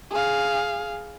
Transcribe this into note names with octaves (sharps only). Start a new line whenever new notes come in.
G#4 F5